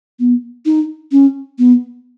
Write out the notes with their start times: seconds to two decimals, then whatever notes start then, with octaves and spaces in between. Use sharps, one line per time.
0.20 B3
0.66 D#4
1.12 C#4
1.59 B3